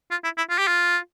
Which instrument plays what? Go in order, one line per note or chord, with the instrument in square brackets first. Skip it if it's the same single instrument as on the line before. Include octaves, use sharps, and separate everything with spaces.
[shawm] F4
E4
E4
F4
G4
F4